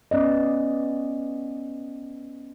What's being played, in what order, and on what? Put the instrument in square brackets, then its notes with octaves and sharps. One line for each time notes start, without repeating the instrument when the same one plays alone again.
[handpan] B3 C#4 D5 D#5